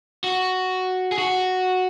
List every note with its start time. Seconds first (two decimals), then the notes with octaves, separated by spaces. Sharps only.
0.24 F#4
1.12 G#4
1.18 F#4